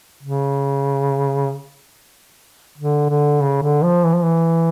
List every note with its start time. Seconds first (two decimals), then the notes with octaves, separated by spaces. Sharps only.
0.23 C#3
2.78 D3
3.09 D3
3.41 C#3
3.62 D3
3.84 F3
4.05 E3
4.14 F3
4.23 E3